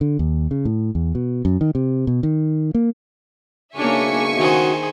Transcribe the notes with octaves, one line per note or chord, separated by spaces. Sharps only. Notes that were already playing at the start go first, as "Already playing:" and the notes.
D3
D#2
C#3
A2
E2
B2
F#2
D#3
C3
B2
D#3
A#3
B1 G#2 C#3 A#3 D4 E5 G#5 C#6
D#3 F#4 G#4 C5